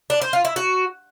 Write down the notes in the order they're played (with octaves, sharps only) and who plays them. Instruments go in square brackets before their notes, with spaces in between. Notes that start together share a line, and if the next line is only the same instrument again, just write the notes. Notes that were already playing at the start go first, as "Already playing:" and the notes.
[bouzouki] D4
C5
F4
E4
F#4